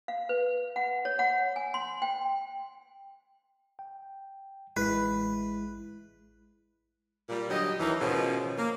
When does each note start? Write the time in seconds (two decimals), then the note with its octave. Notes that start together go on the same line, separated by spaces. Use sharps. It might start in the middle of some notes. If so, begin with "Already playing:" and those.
0.08 F5
0.29 B4
0.76 F#5
1.05 C#5
1.19 F#5
1.56 G#5
1.74 C6
2.02 G5
3.79 G5
4.77 A1 G#3 E4 B4
7.29 A#2 G3
7.49 D3 F#3 G4 D#5
7.79 D#2 E3 A#3 D#4 E4
7.99 G#2 B2 D#3 F3 C#4
8.57 A#3